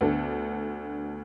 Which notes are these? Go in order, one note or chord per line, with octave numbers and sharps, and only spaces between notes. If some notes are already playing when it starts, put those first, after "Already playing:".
D2 D3 B3 D4 A4